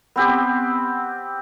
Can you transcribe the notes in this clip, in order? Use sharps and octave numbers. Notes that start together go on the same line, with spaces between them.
B3 C4 G4